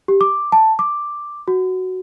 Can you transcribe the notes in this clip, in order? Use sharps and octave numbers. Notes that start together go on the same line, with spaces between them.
G4
D6
A5
D6
F#4